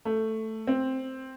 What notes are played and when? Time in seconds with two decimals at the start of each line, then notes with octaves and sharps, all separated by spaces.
0.05 A3
0.67 C4